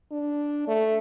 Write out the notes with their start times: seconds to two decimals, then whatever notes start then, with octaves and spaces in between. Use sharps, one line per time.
0.11 D4
0.67 A3